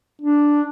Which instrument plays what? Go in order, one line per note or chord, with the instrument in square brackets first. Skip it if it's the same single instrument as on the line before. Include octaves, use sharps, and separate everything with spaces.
[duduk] D4